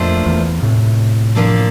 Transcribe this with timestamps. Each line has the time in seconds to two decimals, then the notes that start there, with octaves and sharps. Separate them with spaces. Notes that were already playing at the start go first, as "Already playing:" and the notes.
Already playing: F2 A#2 A3 D4 F4 C5
0.26 E2
0.62 A2 C3
1.35 F3 A#3 D4 A4